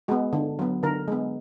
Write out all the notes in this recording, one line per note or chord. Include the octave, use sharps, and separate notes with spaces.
G#3 B3 F#4
D3
F#3 B3
D3 A#4
G#3 B3